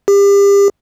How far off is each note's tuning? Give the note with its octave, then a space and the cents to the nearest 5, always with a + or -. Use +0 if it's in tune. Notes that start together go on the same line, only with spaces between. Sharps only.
G4 +35